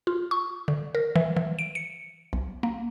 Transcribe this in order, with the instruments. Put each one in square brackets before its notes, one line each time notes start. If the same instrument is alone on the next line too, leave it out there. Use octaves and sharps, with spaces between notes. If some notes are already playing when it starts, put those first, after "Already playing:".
[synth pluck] F4
C#6
D3
A#4
E3
E3
D7
C#7
B1
A#3